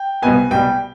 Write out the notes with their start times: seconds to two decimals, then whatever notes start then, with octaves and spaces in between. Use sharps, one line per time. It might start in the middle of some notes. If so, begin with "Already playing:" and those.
Already playing: G5
0.22 C2 B2 B3 G#5
0.51 C2 B2 G3 G5